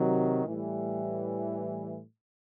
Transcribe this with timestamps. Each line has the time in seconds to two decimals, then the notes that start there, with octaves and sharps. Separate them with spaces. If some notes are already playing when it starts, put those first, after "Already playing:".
Already playing: C3 D#3 F#3
0.45 A2 E3 G3